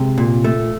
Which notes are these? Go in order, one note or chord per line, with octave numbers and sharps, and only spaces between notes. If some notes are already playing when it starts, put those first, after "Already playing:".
Already playing: C3 G#3
A#2
A3